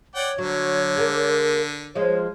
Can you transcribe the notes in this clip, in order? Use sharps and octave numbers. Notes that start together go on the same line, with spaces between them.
C#5 D5 F#5 G5
D3 F#3
G#3 A#3 A#4
F3 G#3 C#5